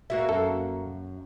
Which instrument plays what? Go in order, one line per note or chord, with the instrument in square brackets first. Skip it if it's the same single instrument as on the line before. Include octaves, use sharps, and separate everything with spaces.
[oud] A#3 F#4 E5
[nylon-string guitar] F#2 F5 [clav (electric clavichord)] A4